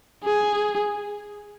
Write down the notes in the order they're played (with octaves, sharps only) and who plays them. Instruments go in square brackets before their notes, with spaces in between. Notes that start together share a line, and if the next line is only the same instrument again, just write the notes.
[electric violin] G#4